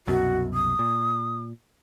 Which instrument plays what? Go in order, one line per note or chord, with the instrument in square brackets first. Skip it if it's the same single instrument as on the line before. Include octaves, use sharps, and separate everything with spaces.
[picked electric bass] C2 F#2 B2 [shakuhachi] F#4
[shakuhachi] D#6
[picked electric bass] A#2